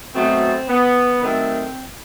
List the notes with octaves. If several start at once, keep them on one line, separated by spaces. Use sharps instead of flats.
B2 F#3 A3 C4
B3
D#3 F#3 A3 C4